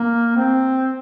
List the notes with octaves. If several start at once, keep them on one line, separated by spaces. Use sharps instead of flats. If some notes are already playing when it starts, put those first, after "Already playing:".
Already playing: A#3
C4